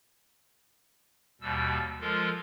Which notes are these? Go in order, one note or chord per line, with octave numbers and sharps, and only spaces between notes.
D#2 B2 G3 E6
F3 G#3 F4 A4 A#4